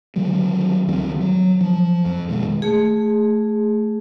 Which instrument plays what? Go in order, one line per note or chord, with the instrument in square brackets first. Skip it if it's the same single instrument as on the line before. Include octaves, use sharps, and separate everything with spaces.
[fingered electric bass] D3 D#3 F#3 G3
C#2 D#3 G3 C4
F#3
F3
F2
B2 D#3 G#3
[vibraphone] A3 G#4